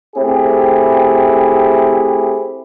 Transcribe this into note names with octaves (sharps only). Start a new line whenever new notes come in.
A3 C4 E4 G4 G#4